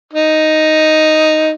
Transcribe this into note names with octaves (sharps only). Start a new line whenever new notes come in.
D#4